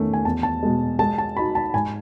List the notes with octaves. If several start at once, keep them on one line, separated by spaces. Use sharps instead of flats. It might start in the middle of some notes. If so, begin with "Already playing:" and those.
Already playing: E2 D#3 A3 C#4
G#5
E2 A5
A5
B2 G#3
G#3 A5
A5
D#4 F#4 B5
A5
G#2 G#5